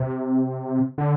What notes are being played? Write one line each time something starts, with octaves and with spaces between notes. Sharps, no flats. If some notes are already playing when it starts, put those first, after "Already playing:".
Already playing: C3
D3